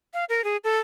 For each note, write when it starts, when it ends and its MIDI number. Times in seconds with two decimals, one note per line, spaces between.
0.14 0.24 77
0.29 0.44 70
0.44 0.57 68
0.64 0.79 69